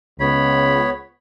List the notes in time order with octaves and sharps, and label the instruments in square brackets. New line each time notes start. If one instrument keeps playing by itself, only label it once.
[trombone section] C#2 [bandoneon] B3 C#5 [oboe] B5